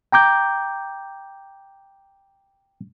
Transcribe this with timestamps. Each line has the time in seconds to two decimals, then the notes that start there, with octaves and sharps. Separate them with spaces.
0.12 G5 A#5 D6 G6